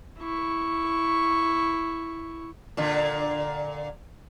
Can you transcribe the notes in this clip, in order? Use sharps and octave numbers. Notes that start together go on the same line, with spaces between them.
E4 C#6
A#2 D3